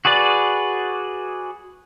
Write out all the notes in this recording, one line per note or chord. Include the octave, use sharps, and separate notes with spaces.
F#4 G#4 B4 D5